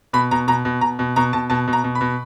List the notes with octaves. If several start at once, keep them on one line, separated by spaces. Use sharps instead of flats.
B2 B5
B2 A#5
B2 A#5
B2
B2 A#5
B2
B2 A#5
B2 A5
B2 A5
B2
A#5
B2
B5
B2